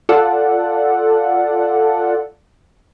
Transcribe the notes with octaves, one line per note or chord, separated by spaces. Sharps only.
F4 A4 D5 F#5